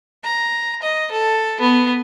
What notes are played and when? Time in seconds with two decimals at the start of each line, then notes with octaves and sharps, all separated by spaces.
0.24 A#5
0.82 D#5
1.12 A4
1.61 B3